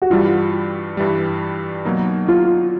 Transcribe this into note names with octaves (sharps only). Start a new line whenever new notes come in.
F#4
G2 E3 G3 F4
G2 E3 G3
B2 F#3 A#3 D#4
F4